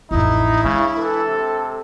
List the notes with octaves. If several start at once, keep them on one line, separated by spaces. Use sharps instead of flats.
A1 F2 D#4 E4
C#3 G#3 D4
E3 A4
C3